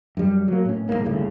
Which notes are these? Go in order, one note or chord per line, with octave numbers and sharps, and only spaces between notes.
F#2 G3
F#3 A#3
A2 C#4
D#1 D#2 G#2 A#3
G1 D#2 A2 C#3